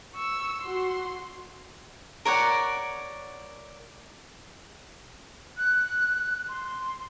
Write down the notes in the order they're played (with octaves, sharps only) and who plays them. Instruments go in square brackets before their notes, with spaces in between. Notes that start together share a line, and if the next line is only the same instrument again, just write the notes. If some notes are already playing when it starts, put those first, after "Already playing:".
[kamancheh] C#6 E6
F#4 C6
[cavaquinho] A#4 C#5 D5 F#5
[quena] F#6
C6